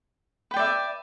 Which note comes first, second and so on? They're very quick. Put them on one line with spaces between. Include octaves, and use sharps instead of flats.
B4 G5 D5 E5